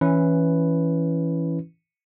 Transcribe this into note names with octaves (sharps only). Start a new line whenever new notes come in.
E3 C#4 E4 B4